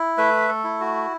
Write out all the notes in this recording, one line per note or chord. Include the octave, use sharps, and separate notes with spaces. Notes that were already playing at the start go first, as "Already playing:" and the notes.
Already playing: E4
A3 B4 E5
A4
E4
F#4